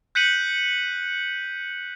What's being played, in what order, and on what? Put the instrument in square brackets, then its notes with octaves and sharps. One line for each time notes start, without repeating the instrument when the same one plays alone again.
[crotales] F#6 G6 B6 C#7 D#7 F#7